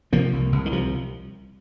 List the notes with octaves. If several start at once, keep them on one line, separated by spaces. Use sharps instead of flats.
C3 F3 A#3
C2
C2
D#3
C3 F3